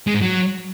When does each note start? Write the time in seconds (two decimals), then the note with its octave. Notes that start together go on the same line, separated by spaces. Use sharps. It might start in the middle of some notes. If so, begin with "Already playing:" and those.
0.07 G#3
0.14 G#2
0.22 F#3